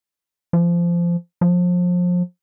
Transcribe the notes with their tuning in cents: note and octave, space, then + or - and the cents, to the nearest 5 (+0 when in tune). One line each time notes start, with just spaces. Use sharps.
F3 -20
F3 +30